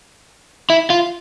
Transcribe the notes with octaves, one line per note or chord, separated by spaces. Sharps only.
E4
F4